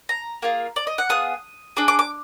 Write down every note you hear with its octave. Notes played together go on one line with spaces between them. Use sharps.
A#5
A#3 F4 G#4
D5
D#5
F#5
B3 F4 G#4 D#6
D4 G#4 D6
D6
D6